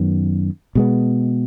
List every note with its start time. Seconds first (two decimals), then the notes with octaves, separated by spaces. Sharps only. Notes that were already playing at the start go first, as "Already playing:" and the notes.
Already playing: F#2 D#3 F#3 B3
0.75 B2 G#3 B3